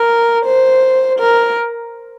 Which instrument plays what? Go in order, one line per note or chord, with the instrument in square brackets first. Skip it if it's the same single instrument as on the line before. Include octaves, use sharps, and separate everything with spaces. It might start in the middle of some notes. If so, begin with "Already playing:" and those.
Already playing: [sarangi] A#4
C5
A#4